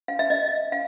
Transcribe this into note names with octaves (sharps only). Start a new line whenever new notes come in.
F5
E5
D#5
F5